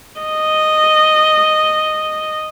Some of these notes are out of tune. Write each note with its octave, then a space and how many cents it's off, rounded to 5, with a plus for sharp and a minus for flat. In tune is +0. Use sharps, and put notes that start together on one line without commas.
D#5 -5